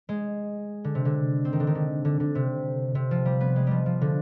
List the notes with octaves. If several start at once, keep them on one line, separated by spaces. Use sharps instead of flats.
G#3
D3
C3
D3
C4
D#3
D3
D#3
D3
D3
D3
C3
C3
F3
G3
B3
G#3
F3 G3
F3
D3